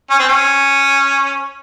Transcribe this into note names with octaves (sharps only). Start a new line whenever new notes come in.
C#4
C4
C#4